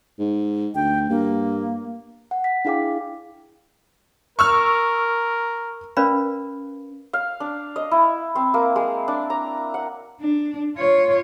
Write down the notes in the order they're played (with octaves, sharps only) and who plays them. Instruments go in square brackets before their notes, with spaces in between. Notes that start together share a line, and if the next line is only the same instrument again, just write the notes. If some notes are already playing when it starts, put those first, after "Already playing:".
[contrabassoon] G#2
[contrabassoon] D2 [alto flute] G5
[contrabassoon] G2 [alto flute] A#3
[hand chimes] F#5
B6
D4 E4 G#4 F5 G5 D6
[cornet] A#4 [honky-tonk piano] C#6 E6 F6
[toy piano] C#4 A#4 B4 D5 F5 B5
[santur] F5
D4
D#5
E4
C4
A#3
G#3
D4
A#5
F#5
[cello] D4
F4 C#5